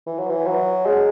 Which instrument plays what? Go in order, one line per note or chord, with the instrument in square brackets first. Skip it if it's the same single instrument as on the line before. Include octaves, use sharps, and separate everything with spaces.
[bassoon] E3
F#3
E3
F#3
G#3